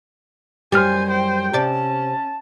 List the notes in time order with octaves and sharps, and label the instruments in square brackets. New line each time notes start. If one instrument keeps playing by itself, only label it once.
[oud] F#2 G3 [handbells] G4 F6 [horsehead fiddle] C5 G#5
[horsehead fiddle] C5 G5
[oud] C3 D5 [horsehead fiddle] C#4 [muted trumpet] A5